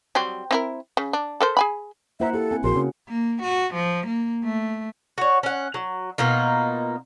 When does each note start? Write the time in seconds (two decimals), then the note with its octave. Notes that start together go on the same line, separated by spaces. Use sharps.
0.15 F#3 G3 C4
0.51 C4 E4 A#4
0.97 C#3
1.13 D4
1.41 A4 A#4 C5
1.57 G#4 G#5 B5
2.20 A#3 E4 C5 E5 F#5 A#5
2.34 E4 G4 A4
2.51 C4 G#5
2.64 A#1 F#4 G#4 A#4 C6
2.76 C#3 F#4
3.08 A#3
3.42 F#4
3.74 F3
4.06 A#3
4.44 A3
5.18 F#4 C#5
5.43 C#4 F#5
5.74 F#3
6.18 B2 A#3 D#4 F4